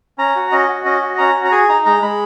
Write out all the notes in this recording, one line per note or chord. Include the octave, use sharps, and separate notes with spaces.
C#4 A#5
F#4
C#4 D#5
F#4
C#4 D#5
F#4
C#4 A#5
F#4
A#5
G#4 G#5
D#4 A#5
G#3 A#5
G#3 B5